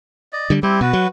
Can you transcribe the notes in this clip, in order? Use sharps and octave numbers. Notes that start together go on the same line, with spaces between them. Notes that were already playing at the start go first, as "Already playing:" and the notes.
D5 D#5
D3 G3
G3 C4 E4 G4
B2 F#4 B4
F#3